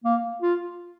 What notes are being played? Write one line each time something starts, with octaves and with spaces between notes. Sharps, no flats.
A#3
F4